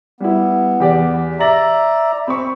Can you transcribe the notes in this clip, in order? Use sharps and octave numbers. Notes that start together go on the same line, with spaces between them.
G3 B3 E4
E2 G4 D5
D5 E5 A#5 A6 A#6 F#7
C4 B5 C#6